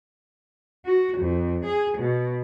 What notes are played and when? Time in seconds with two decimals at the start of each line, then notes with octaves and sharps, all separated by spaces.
0.85 F#4
1.19 F2
1.65 G#4
1.98 B2